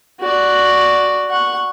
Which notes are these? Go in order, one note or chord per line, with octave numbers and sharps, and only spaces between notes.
F#4 D5
F#5 C#6